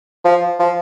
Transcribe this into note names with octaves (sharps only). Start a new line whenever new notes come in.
F3
F3